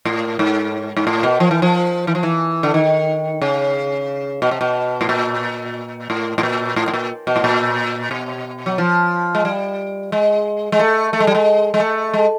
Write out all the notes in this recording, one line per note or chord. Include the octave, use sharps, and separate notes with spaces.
A2
G#2
G#2
A2
B2
F3
E3
F3
E3
F3
E3
D3
D#3
C#3
B2
C3
B2
A2
A#2
A2
A2
A#2
A2
A2
A#2
B2
A2
A#2
B2
F#3
F3
G#3
G3
G#3
G#3
A3
A3
G#3
G3
G#3
G#3
A3
G#3